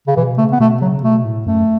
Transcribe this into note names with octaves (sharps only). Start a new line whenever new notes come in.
C#3
B2 E3
C#3 A3
B3
B2 A3
C#3 F#3
B2 A3
A2
F#2 A3